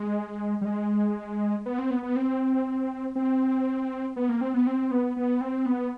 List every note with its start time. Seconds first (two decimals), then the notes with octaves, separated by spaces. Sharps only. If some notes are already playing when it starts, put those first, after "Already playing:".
Already playing: G#3
0.61 G3
0.65 G#3
1.66 B3
1.79 C4
1.90 B3
2.03 B3
2.16 C4
3.15 C4
4.16 B3
4.29 A#3
4.41 C4
4.54 B3
4.67 C4
4.91 B3
5.16 B3
5.41 C4
5.66 B3